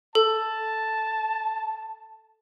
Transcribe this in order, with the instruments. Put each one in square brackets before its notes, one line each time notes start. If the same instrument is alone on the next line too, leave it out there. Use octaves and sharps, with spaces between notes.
[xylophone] A4 [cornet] A5